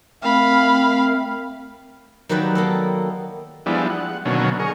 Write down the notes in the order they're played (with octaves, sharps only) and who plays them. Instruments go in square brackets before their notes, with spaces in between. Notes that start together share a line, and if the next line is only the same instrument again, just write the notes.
[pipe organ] A3 C4 A#4 [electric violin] F5 B5
[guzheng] D#3 F#3 A#3 G4 B4 D5
A#3 B3 A4
[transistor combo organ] F3 G3 G#3 B3 D4 E4
F#5
B2 D3 D#3 F#3 A#3 C#4
G#4 A#4 C#6